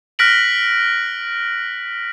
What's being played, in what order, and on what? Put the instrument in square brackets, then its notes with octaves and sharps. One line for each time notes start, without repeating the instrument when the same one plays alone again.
[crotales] F6 F#6 A#6 B6 D7 F#7